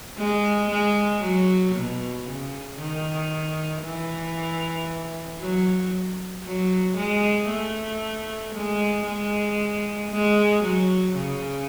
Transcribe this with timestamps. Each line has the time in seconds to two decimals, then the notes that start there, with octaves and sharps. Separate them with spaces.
0.18 G#3
0.70 G#3
1.22 F#3
1.75 B2
2.27 C#3
2.79 D#3
3.84 E3
5.40 F#3
6.45 F#3
6.97 G#3
7.49 A3
8.55 G#3
9.06 G#3
10.11 G#3
10.63 F#3
11.15 C#3